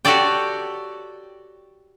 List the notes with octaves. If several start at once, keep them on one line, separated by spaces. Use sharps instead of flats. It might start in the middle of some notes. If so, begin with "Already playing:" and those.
F#4 G4 A4 C#5 D5 G5